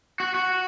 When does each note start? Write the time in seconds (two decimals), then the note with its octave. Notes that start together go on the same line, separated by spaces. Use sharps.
0.20 F#4
0.34 F#4